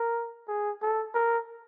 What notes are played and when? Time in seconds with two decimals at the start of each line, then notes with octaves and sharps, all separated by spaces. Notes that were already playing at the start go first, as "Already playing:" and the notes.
Already playing: A#4
0.48 G#4
0.82 A4
1.14 A#4